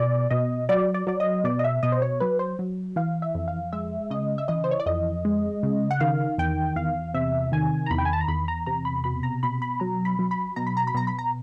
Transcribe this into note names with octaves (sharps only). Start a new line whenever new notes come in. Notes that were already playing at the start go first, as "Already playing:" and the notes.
Already playing: B2 D5
B2 D#5
F#3 D5
D5
F#3 D5
D#5
B2 D5
D#5
E5
B2 D#5
C5
C#5
F#3 B4
C5
F#3
E3 F5
E5
F2
F5
G#3 E5
C#3 D#5
E5
E3 D#5
C5
C#5
D5
F2 D#5
G#3
C#3
F#5
D#3 F5
E2 G5
E2 F5
C3 E5
D#3 G#5
A#5
E2 B5
G5
G#5
A5
A#5
E2 B5
A#5
C3 A#5
B5
B2 B5
A#5
B2 B5
B5
F#3 A#5
B5
F#3
B5
B2 A#5
B5
A#5
B5
B2 A#5
B5
A#5